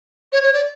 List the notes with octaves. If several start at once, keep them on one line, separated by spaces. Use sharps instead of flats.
C#5
C#5
D5